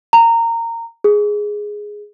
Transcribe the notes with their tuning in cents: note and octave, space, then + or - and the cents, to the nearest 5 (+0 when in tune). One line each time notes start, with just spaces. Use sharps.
A#5 -20
G#4 +0